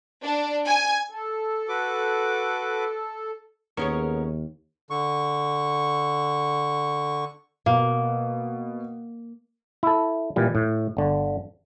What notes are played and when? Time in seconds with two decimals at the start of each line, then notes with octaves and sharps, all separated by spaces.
0.24 D4
0.66 G#5
1.10 A4
1.69 F#4 B4 D6
3.77 D#2 B3 C#4 G#4 A#4 C#5 C#6
4.90 D3 C#6
7.66 B2 A#3
9.83 E4 A4
10.36 A#2 E3 G3
10.55 A2
10.97 G1 D3